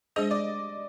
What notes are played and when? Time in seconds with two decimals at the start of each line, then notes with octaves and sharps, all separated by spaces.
0.16 G#3 D4 G#4 C5 D#5
0.31 D5